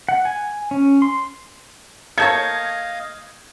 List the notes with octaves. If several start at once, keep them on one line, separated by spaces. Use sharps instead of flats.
F#5
G#5
C#4
C6
A#3 A4 C#5 D#5 F5 G6 G#6 C#7